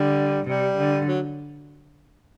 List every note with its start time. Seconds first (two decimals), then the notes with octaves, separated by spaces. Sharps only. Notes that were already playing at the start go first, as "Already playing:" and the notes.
Already playing: D3 G3
0.46 C3 G3
0.76 D3
1.07 F#3